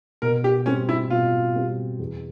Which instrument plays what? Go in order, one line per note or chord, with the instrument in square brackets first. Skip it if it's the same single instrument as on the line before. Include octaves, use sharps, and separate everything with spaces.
[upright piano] B2 [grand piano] A#4
[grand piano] G4
[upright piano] G3 C4 [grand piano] C#4
[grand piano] E4
[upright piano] B2 [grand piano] F4
[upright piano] G3 C4
E2